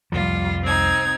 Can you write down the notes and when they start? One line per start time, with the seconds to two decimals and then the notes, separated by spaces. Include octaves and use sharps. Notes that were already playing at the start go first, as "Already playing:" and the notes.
0.12 C2 F2 F3 G3 F4
0.63 C4 D#4 G#6